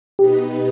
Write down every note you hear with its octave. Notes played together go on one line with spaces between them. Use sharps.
B2 B3 D#4 G4 B4 D#5